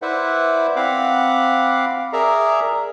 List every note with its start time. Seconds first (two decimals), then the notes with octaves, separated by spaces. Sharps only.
0.02 E4 B4 C5 D5 E5 F#5
0.76 C4 F5 F#5 B5 D6
2.13 G#4 A#4 D5 E5 A#5